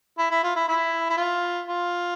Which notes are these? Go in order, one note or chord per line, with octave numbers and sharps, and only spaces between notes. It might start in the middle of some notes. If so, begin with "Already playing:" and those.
E4
E4
F4
E4
E4
E4
F4
F4